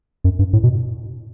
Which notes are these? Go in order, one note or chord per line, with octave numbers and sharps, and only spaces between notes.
F#2
G2
A2
B2